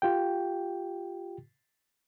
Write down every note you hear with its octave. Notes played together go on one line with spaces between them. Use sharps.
F4 G4 G5